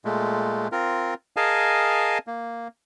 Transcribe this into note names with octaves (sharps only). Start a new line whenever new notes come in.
A#2 G#3 A3
C4 F4 A#4
G#4 A#4 D#5 F5 G#5 A5
A#3